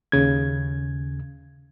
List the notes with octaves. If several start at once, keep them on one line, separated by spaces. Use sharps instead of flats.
D#2 C#3 G#6